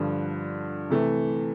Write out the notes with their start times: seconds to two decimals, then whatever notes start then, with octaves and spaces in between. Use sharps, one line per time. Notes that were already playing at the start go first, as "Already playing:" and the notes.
Already playing: G2 D3 F3
0.90 C3 E3 A3